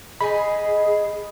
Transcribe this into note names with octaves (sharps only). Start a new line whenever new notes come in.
D#4 G#4 D#5 G#5 B5